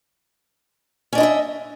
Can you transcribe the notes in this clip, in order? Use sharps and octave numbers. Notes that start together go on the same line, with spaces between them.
C#4 D4 E4 D#5 E5